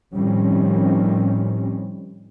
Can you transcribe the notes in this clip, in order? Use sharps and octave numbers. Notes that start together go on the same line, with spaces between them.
A2 D#3 F3 G3 C4 C#4